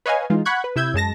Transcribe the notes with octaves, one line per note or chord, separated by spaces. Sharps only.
B4 C#5 D#5 F5 G#5
E3 G#3 D#4 F4
F#5 B5 C#6 F#6 G#6
B4
C3 E4 E6 G6 G#6
F#2 G#3 A5 A#6